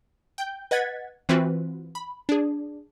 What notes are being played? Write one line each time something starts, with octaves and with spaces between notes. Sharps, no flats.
G5 G6
B4 D#5 F#5 G#6 A6 B6
E3 C4 F4 F#4 B4
B5
D4 G#4